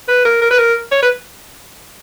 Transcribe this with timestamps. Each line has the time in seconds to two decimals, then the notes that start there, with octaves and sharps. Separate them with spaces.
0.08 B4
0.25 A#4
0.41 A#4
0.51 B4
0.59 A#4
0.92 C#5
1.02 B4